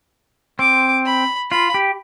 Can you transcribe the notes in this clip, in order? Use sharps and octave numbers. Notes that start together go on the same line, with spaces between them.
C4 D6
B5
F4 B5
G4